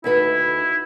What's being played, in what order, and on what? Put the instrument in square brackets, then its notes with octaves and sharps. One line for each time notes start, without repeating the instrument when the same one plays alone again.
[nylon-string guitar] D2 D#4 B4 [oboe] E4